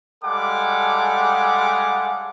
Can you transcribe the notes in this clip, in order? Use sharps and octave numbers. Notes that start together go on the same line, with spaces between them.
G3 G#3 A4 F5 F#5 D6